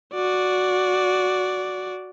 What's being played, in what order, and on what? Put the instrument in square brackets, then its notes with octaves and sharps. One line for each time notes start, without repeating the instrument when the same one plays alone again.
[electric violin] F#4 D5